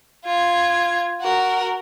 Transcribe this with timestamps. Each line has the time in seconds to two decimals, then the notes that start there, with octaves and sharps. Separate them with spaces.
0.24 F4 G#6
1.20 F#4 A#4